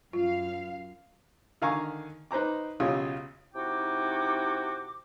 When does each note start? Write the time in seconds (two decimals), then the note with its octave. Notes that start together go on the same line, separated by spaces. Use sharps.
0.13 F#2 F4 F5
1.62 D3 D#3 F5 G#5 A#5 C#6
2.31 D#4 B4 C5 A#5 D6
2.80 B1 C#3 F4 G4 C#5 D#6
3.54 C3 D#4 E4 F#4 G5 D6